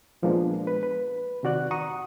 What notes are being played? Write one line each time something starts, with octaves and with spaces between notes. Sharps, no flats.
A#2 F3 G#3 A#3 B3 D4
B4
B4
C3 D#3 F#4 D5 F#6
F#5 A#5 C#6 D#6